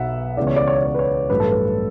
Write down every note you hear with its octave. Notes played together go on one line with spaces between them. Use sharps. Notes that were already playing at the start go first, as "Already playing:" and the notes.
Already playing: B1 B2 F#3 B3 E5 F#5
C#2 C#3 E3 B3 D5
C#5
D5
C#5
D5
C#5
B4
C#5
A1 G2 F#3 A3 B4
A4
B4